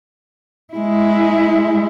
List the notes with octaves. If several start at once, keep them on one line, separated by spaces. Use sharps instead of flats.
G#3 E4